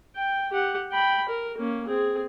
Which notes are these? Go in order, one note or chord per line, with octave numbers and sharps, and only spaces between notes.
G5
G4 F#5
G5 B5
A#4
A#3 C#4
C4 G#4